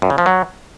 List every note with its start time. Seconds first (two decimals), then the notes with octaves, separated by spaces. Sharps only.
0.02 F#2
0.10 C#3
0.18 F3
0.26 F#3